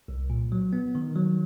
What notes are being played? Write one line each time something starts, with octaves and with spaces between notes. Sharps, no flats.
C2
A#2
F#3
B3
D#3
F#3